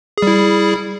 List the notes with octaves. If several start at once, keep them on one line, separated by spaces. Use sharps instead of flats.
G3 E4 G#4